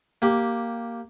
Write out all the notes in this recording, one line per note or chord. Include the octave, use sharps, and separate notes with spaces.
A#3 G4